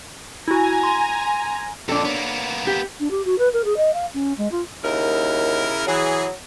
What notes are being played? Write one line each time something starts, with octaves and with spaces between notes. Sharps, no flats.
E4 F#4 G#5 A#5
C6
F2 A#2 D4 A4
A#3 B3 C#5
G4
D4
G4
F#4
B4
A#4
G#4
D#5
F5
C#4
G#3
F4
D#2 C#3 E4 A#4
E3 F#3 G#4